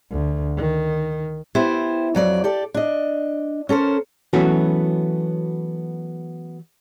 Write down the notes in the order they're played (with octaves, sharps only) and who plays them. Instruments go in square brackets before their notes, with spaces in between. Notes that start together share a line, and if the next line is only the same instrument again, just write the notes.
[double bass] D2
D#3
[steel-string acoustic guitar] B3 E4 G4 C5
F2 F#3 D5
G4 A4 D5
D4 D#5
C#4 A4 A#4 C5
[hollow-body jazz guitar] E3 F#3 A3 B3 C#4 F#4